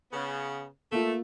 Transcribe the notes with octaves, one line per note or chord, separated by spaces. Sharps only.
C#3 B3
A3 A#3 F4